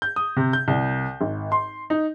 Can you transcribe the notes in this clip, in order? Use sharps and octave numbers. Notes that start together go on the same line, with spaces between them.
G6
D#6
C3
G6
C2
G#1
C6
D#4